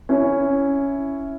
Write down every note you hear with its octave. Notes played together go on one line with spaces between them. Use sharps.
C#4 E4